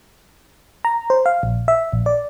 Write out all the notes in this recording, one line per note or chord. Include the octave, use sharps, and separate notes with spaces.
A#5
C5
F5
A#1
E5
A#1
D5